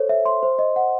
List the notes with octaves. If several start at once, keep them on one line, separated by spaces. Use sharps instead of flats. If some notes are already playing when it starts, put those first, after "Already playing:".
Already playing: A4 C5 C#5
E5
C6
C5
D#5
F#5